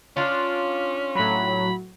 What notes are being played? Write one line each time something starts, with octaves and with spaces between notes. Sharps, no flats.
C#4 D4 F4
A2 F#3 B5